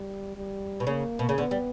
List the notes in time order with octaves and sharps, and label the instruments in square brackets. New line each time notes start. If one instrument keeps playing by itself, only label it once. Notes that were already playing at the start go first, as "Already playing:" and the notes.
Already playing: [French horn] G3
G3
[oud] B2
[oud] C#3 [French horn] A#3
[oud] B2
C#3
[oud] D3 [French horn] B3
[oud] G3